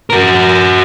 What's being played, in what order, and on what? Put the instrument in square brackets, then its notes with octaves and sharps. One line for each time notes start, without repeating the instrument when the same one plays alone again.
[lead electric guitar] F#4 A#4